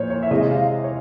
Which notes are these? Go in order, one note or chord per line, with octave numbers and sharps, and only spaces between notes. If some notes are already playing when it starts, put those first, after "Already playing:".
Already playing: A#2 F3 A#3 C5 C#5
C#5
E5
C3 E3 G#3 D#5
F5
C#5